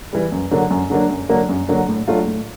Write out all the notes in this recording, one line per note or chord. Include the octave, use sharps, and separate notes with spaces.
E3 G3
F#2
D3 F#3 A#3 D4
F#2
D3 F#3 A#3 D4
F#2
D3 F#3 A#3 D4
F#2
D3 F#3 A#3 D4
A2
F#3 A3 D4 F4
A2